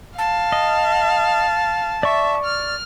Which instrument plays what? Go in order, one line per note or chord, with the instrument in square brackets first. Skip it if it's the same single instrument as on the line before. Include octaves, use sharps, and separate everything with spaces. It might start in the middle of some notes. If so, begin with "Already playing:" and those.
[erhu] F5 [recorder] A5
[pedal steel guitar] D#5
[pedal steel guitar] D5 C#6 [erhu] E5
[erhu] F6